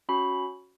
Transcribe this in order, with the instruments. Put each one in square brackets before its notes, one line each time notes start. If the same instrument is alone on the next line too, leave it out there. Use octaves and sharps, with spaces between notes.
[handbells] C#4 F#4 B5